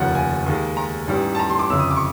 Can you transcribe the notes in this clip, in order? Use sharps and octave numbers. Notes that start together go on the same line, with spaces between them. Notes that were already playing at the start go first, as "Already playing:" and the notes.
Already playing: F1 D#2 C#3 F3 F#5
G#5
D#2 D#3 G#3
A#5
A1 G#2 E3 G3
A5
A#5
C6
D6
G1 F2 C#3 E6
D#6
D6
C#6